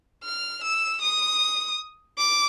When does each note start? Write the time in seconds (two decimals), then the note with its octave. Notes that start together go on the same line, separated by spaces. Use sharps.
0.24 F6
0.63 E6
1.02 D#6
2.18 D6